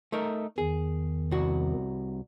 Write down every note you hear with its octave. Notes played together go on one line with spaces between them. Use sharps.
A3 D#4 A#4
E2 D#3 G#4
C2 F#4